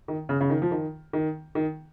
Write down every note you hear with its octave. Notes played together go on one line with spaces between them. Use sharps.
D#3
C#3
C#3
D#3
F3
D#3
D#3
D#3